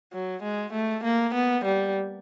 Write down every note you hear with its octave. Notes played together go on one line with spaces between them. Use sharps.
F#3
G#3
A3
A#3
B3
G3